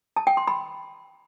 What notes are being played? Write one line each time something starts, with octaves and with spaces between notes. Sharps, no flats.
A5
G5
C6
B5